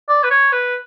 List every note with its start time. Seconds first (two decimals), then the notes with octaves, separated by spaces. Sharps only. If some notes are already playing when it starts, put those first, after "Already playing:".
0.09 D5
0.23 B4
0.31 C#5
0.52 B4